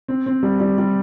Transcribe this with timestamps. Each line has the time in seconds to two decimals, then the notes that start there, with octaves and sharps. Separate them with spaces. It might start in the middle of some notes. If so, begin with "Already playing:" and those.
0.08 C4
0.26 C4
0.43 G3
0.60 G3
0.78 G3